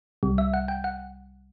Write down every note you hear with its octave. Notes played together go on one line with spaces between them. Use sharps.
C2 C3 G3
E5
F#5
G5
F#5